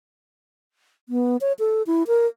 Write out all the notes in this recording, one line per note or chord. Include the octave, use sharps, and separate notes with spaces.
B3
C#5
A4
E4
A#4